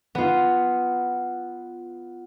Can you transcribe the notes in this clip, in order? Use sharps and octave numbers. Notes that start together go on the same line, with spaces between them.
B3 F4